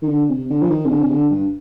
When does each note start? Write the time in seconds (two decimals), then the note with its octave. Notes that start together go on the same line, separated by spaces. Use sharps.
0.02 D#3
0.08 D3
0.29 C3
0.50 D3
0.62 F3
0.70 D#3
0.86 C3
0.91 D3
1.02 C3
1.11 D3
1.31 G2